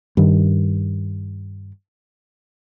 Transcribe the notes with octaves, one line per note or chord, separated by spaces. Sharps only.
G2 D#3